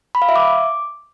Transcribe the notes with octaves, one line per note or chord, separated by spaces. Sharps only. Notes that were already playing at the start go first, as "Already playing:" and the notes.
B5
F5
E5
D6